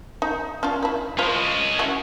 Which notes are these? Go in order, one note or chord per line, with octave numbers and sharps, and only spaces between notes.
D#4
C#4 D4 F4
E4 B4
C#4 F4 B4 C5 D#5
E3 F#4